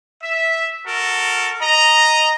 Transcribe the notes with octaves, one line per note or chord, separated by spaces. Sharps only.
E5
F#4 A4 A#4
D#5 A#5